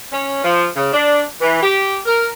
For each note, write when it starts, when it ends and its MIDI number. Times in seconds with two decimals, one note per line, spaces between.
0.12 0.42 61
0.44 0.66 53
0.76 0.91 49
0.93 1.22 62
1.40 1.60 52
1.62 1.97 67
2.06 2.29 70